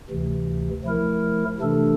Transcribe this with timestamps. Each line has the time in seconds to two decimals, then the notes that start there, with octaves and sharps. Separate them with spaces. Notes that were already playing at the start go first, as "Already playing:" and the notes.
0.10 D2 C3 E3
0.85 F3 A3 E4 A#4
1.59 C3 E3 A3 D4 A4